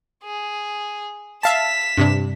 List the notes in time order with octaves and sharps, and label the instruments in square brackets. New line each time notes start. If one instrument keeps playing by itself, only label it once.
[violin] G#4
[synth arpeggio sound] E5 F5 A5 [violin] B6 E7
[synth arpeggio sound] G2 C3 D4